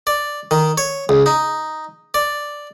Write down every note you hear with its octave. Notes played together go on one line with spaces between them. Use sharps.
D5
D#3
C#5
C#2
D#4
D5